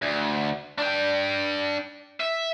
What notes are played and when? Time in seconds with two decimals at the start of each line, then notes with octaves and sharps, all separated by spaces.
0.02 D2
0.79 D4 G5
2.20 E5